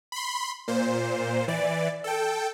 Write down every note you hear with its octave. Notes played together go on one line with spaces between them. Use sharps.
B5 C6
A#2 C5
E3 D5
A4 G5